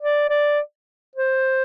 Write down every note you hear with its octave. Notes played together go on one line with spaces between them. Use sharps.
D5
D5
C5